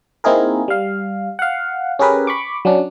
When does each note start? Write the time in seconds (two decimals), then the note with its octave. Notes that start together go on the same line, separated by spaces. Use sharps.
0.24 A#3 C4 D#4 E4 G#4 A#4
0.68 G3 F5
1.39 F5 F#5
1.99 C#4 G4 G#4 A#4 B4
2.27 B5 C#6 D6
2.65 F#3 C#4 D4